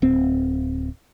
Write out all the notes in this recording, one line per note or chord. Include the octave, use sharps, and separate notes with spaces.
D1 C4